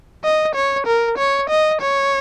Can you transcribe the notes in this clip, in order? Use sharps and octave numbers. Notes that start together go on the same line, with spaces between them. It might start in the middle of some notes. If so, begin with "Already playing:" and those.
D#5
C#5
A#4
C#5
D#5
C#5